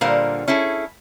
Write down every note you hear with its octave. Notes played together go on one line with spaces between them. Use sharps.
A#2 D3 G3 A#4 C5 F5
C#4 E4 G#4 A4